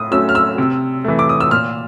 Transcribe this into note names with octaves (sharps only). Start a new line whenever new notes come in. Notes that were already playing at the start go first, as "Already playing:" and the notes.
Already playing: A2 D#6
F#3 A3 C#4 E6
F6
E6
C3
E3 A3
D6
D#6
E6
A#2 F6